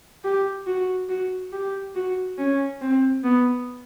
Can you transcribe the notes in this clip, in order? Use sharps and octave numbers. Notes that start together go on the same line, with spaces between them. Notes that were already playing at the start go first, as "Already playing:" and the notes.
G4
F#4
F#4
G4
F#4
C#4
C4
B3